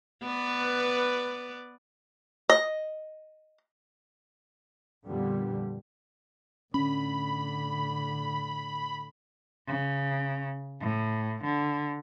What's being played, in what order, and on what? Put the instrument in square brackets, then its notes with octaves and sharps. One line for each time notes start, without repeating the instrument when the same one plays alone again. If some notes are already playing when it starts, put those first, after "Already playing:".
[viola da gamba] B3 B4 D5
[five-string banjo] D#5
[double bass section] F2 A#2 D3 G3 B3
[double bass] A2 D3 [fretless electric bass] C#4 [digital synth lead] B5
[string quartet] C#3
A2
D3